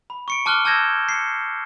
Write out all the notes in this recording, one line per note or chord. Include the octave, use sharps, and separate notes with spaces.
B5
C#6 C#7 D7
A5 D6 F6 F#6 C#7 G7
A5 E6 G6 G#6 A#6 E7
C7 C#7